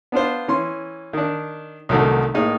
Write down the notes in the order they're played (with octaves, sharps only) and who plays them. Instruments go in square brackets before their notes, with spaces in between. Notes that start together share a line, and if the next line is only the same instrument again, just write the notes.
[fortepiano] B3 D4 F4 C5
E3 C#4 C6
D#3 D4
C2 D3 D#3 F#3 A3
A2 A#3 D#4 G#4 D#6